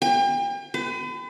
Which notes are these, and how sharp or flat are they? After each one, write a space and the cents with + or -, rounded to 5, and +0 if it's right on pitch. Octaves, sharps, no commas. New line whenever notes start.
G5 +40
B4 +40